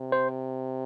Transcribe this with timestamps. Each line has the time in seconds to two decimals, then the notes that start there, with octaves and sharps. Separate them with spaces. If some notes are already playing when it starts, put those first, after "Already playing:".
Already playing: C3
0.12 C5